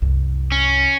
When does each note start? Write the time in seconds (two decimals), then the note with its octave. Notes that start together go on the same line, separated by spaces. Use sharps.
0.02 C2 F#2
0.52 C#4